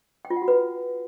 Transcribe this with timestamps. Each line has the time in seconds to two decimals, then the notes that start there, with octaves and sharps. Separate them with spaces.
0.25 G5
0.30 F4
0.36 F#5
0.42 F#4
0.48 B4